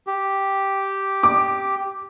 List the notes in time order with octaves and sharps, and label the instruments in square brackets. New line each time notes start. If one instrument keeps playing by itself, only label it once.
[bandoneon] G4
[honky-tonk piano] D6